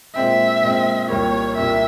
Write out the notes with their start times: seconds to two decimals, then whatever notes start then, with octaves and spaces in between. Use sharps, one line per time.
0.16 A#2 G#3 C4 E5
0.63 A#2 G#3 C4
1.10 C2 A#2 G3 A#3 C#5
1.57 C2 A#2 G3 A#3 E5